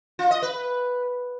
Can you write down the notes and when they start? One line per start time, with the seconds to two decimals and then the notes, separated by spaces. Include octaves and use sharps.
0.19 F4
0.31 D#5
0.42 B4